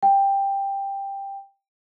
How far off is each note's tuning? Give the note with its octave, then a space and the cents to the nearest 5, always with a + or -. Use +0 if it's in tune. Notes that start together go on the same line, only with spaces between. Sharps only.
G5 +10